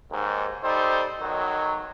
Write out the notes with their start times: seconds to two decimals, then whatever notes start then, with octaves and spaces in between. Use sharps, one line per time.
0.10 D#2 G#2
0.64 G3 D#4 A4 C5
1.20 B1 D#3 F#3